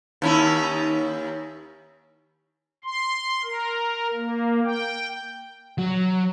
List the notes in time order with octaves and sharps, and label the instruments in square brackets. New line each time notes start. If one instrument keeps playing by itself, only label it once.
[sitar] D#2 C#4 E4
[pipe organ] C6
A#4
A#3
G5
[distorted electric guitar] F#3